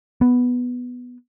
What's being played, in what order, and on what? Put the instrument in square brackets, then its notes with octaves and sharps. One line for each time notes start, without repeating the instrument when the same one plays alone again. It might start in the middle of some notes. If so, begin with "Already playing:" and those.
[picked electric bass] B3